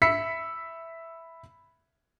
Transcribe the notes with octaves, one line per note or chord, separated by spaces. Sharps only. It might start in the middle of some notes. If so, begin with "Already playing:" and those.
E5 B5 E6 B6 C#7